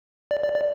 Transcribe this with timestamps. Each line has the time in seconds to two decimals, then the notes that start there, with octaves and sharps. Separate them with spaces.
0.31 D5
0.43 D5
0.55 D5